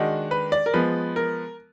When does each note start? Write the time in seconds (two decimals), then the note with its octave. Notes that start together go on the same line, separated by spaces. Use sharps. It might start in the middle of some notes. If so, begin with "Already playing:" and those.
Already playing: D#3 G#3 D4 F#4
0.31 B4
0.52 D5
0.66 A#4
0.74 F3 G#3 B3 B4
1.16 A#4